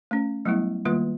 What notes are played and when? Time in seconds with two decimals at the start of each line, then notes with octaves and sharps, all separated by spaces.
0.11 A3 C#4
0.45 F#3 G3 A3 B3 E4
0.85 D#3 G3 A#3 F4 B4